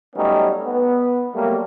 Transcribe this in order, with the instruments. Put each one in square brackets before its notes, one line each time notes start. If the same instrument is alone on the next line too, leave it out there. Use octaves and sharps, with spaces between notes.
[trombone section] F#3 G3 A3 B3 C#4 D#4
B3
F#3 G3 A3 A#3